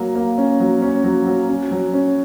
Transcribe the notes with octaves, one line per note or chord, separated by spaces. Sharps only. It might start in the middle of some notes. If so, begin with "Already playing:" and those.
Already playing: F#3 A#3
A#3
C#4
F#3
C#4
F#3
F#3
C#4
F#3
C#4